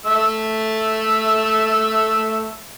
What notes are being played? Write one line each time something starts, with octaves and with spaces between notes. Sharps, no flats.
A3 E6